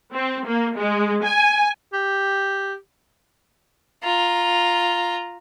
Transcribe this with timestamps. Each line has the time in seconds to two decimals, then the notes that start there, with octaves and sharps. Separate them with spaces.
0.14 C4
0.46 A#3
0.77 G#3
1.24 G#5
1.93 G4
4.03 F4 A#5